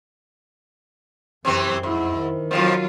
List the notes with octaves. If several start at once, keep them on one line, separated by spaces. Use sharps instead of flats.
F#2 C3 E3 C4
F2 G#2 E4
D#3
F2 A#2 F3 F#3 F4